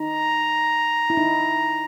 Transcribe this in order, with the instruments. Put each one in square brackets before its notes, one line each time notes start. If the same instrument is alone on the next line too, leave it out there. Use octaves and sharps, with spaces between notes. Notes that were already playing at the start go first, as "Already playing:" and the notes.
Already playing: [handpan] D#4 [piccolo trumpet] A#5
[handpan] E4
D#4